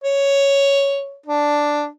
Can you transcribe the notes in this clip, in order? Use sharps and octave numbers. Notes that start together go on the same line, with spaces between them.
C#5
D4